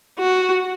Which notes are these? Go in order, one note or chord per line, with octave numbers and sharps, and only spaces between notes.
F#4